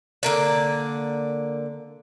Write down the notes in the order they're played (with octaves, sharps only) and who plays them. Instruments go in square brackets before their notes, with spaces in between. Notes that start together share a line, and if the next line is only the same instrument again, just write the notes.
[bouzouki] D3 A#3 D5